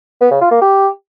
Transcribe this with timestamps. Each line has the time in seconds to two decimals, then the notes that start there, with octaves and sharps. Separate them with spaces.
0.21 B3
0.31 C#3
0.41 F4
0.51 A#3
0.61 G4